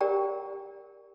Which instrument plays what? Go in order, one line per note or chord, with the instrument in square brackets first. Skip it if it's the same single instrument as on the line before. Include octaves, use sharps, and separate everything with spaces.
[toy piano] G4 A#4 D5 G5 A#5